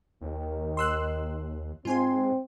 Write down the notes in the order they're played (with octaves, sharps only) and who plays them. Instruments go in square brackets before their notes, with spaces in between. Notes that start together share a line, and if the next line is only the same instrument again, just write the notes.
[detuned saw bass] D#2 [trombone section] D#3
[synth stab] C6 E6 F#6
[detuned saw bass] G#2 [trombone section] C4 [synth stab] F4 G#5 C6